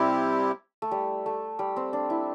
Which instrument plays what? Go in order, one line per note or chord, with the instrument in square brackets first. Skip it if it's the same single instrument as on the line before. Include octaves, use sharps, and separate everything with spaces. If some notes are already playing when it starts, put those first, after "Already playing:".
Already playing: [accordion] C3 G3 C4 E4 G4
[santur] A3
G3
A3
G3
C4
D4
E4